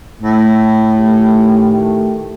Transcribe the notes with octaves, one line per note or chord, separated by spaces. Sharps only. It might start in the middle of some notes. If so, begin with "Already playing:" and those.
A2
D#3 A3 G4